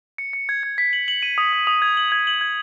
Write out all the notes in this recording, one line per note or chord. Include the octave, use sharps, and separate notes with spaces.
C#7
C#7
G#6
G#6
B6
F#7
F#7
D#7
D#6
D#6
D#6
G#6
F#7
G#6
F#7
G#6